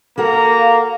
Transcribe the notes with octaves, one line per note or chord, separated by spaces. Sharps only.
A#3 F#4 A4 F#5 A#5
F5